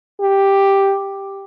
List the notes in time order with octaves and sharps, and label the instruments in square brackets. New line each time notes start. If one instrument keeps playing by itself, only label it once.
[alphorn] G4